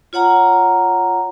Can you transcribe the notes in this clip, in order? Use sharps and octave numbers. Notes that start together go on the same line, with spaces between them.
F4 C#5 F#5 A#5